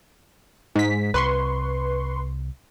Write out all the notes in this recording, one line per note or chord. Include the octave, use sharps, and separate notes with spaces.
G#2 B6
C2 B4 C6 C#6